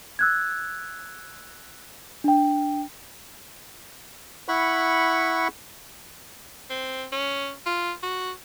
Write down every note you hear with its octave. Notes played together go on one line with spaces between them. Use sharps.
E6 F#6 G#6
D4 G5
E4 F#5 B5 C#6
C4
C#4
F4
F#4